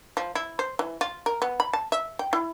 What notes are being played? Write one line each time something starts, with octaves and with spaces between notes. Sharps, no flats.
F3
E4
C5
E3
F4
A#4
B3
B5
A5
E5
G5
E4